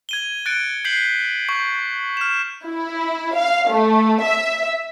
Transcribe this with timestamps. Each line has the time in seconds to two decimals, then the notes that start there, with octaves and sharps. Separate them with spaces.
0.09 G#6 D#7 G7
0.46 F#6 A6 C#7 D7
0.85 G6 B6 C7 F#7
1.49 C#6 G6
2.17 F6 E7
2.66 E4
3.35 F5
3.71 A3
4.22 E5